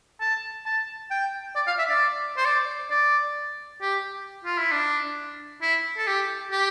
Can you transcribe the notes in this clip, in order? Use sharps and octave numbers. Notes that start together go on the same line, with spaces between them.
A5
A5
G5
D5
F5
E5
D5
C5
D5
D5
G4
F4
E4
D4
E4
A4
G4
G4